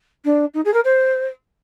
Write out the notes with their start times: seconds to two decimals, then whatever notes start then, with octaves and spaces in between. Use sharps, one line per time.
0.25 D4
0.54 D#4
0.65 G#4
0.73 A#4
0.84 C5